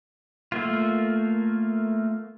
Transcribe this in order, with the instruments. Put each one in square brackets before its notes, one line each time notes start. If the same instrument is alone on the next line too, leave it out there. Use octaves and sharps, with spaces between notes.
[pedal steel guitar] A3 A#3 F4